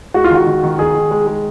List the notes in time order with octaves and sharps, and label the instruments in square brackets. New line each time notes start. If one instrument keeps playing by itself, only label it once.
[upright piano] G#3 [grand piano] F#4
[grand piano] F4
[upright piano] D#3 [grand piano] F#4
[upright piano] D#3
D#3
[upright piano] D#3 [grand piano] G#4
[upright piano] D#3
G#3
G#3